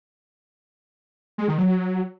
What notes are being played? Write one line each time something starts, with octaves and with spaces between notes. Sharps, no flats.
G#3
D#3
F#3